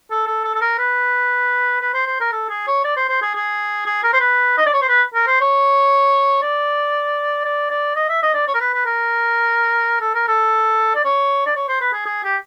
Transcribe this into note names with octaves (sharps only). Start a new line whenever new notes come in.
A4
A4
A4
A4
A#4
B4
B4
C5
C5
A#4
A4
G#4
C#5
D5
C5
C5
G#4
G#4
G#4
A#4
C5
B4
D#5
D5
C#5
C5
B4
A#4
C5
C#5
D5
D5
D5
D#5
E5
D#5
D5
C#5
A#4
B4
B4
A#4
A4
A#4
A4
D5
C#5
D5
C#5
C5
B4
G#4
G#4
G4